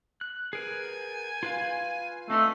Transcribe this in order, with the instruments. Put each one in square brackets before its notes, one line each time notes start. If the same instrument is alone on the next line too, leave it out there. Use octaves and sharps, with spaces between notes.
[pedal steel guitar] F#6
[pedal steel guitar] G#4 A#4 B4 [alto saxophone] G#5
[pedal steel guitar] F4 B4 F5
[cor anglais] A3 [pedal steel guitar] C4 D4 F4 [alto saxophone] D#4